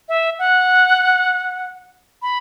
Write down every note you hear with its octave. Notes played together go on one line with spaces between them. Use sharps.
E5
F#5
B5